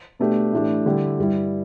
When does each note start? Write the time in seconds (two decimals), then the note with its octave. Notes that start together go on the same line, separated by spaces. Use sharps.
0.19 B2 A3 D4 G4
0.53 A2 E3 A3 D4 G4
0.86 D3 G3 E4 G4
1.19 G2 G3 E4